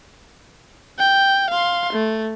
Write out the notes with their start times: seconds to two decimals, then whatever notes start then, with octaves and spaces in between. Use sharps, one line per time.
0.99 G5
1.50 F5 C6
1.93 A3